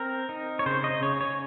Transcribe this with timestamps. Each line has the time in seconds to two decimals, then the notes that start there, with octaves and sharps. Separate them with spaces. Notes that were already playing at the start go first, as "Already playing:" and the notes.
Already playing: C4 A#4
0.29 D#4
0.59 C#5
0.66 C#3 C5
0.84 D#5
1.02 C#3 C#5
1.21 C#5